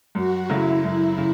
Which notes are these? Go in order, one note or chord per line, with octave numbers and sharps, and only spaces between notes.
F#2 F#4
C#3 F#3 A3 E4
F#2 E4
C#3